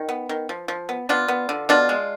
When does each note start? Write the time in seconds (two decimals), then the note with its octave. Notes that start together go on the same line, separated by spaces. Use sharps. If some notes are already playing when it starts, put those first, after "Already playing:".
Already playing: D#3
0.09 B3
0.29 D#3
0.49 F3
0.68 F3
0.89 B3
1.09 B3 D4 F4
1.28 B3
1.49 D3
1.69 B2 D4 F4
1.89 G#3